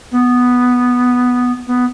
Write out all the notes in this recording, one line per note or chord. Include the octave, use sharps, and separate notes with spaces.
B3
B3